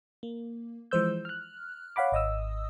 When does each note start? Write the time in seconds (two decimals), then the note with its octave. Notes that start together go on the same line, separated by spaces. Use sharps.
0.23 A#3
0.91 E3 F3 G#3 C5 E6 G6
1.25 F6 F#6
1.96 C#5 F5 F#5 B5 D6
2.12 G#1 D#5 D#6 E6